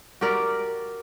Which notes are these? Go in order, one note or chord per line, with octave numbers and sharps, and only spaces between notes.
F#4 G4 A#4 D5